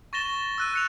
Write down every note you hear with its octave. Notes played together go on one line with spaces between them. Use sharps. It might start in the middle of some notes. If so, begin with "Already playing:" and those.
C#6 A6 A#6 E7 G7
E6 F#6 D#7
F#6 C#7 F7